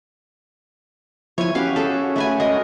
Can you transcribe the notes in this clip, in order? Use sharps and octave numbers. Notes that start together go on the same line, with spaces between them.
F3 E4 C#5 G#5
C#4 F#4 G4 B4 F5
G#4 A4
A3 B4 G#5
G#3 A#4 D#5